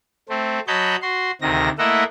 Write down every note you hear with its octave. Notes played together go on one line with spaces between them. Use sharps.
A3 C4
F#3 C#5 D#5 A5 B5 G6
F#4 C6
D2 C3 D#3 A#6
A3 A#3 E4 D#5 E5 F#5